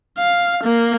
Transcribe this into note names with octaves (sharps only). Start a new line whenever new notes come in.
F5
A#3